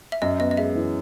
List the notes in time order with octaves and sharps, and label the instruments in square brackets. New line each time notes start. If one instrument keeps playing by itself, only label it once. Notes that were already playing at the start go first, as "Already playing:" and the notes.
[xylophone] E5
[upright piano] F#2 [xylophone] D#5
[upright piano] B3 [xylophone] D#5
[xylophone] D#5
[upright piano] G#3 [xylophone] E5
[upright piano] E3